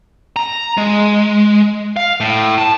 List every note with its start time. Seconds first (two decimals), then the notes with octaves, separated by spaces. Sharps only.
0.36 A#5
0.78 G#3
1.96 F5
2.20 A2
2.58 A5